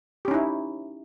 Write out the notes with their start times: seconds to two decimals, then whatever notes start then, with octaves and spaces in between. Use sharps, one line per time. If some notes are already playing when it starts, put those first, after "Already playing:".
0.25 G4
0.28 C#4
0.31 D#4
0.34 E4